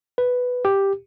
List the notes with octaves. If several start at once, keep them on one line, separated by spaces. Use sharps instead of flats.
B4
G4